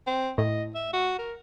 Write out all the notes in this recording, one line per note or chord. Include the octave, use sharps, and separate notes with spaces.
C4
A2 D#5
E5
F#4
A#4